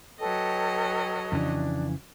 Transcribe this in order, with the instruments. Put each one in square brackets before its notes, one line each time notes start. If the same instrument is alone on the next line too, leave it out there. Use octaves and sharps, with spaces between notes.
[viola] F#3 D#5 [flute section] A4 B4 C#5 [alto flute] G5
[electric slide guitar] F2 C#3 E3 [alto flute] D4